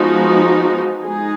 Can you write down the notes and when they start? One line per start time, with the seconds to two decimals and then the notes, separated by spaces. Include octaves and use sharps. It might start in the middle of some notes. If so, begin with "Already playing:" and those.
Already playing: F3 G#3 B3 D#4 F#4
1.04 G#3 D#4 G#4